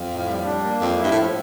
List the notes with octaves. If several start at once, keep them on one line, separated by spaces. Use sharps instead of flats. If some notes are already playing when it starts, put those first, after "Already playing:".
Already playing: F2
A2
G3
D4
A#3
F2 F3
E4
G2
A2
F3